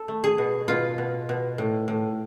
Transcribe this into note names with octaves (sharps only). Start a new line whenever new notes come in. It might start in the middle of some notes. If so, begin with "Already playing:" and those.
Already playing: A4
A3
G#4
B2
B2 F4
B2
B2
A2
A2